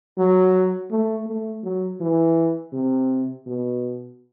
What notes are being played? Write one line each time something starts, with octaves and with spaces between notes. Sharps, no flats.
F#3
A3
A3
F#3
E3
C3
B2